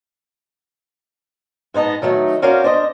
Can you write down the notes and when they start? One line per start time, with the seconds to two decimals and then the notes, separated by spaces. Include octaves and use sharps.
1.74 G#2 B3 D#4 D#5 A5
2.02 D#3 F#3 A3 D#4
2.42 C#4 F#4 A#4 C5 D5 F5
2.64 D4 C5 D#5